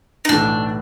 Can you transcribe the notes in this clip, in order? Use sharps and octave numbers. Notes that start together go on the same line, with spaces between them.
D#4
B1 A2 E3 A3 D4